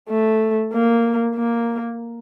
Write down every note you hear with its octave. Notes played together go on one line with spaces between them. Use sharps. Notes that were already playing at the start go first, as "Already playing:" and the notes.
A3
A#3
A#3